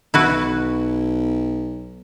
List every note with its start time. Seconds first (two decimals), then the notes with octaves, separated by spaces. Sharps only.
0.14 B1 E4 F#4 B4